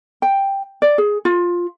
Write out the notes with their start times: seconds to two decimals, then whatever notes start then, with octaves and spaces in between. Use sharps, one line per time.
0.22 G5
0.82 D5
0.98 G#4
1.25 F4